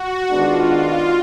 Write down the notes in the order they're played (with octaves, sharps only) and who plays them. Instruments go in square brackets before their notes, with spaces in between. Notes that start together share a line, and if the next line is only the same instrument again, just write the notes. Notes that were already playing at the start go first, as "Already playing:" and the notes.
Already playing: [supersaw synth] F#4
[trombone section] D#3 G#3 B3 D4 [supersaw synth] F4